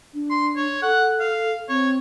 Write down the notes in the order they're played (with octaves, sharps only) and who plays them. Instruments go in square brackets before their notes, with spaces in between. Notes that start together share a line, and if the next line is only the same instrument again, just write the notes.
[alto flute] D4
[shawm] C6
C#5
[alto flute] A4 [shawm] F#5
[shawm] F5
[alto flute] C4 [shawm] C#5